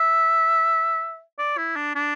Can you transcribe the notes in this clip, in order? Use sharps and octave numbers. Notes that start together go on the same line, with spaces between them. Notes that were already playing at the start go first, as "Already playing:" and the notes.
Already playing: E5
D5
E4
D4
D4